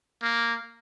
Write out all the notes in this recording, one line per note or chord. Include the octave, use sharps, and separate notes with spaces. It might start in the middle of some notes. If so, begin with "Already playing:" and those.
A#3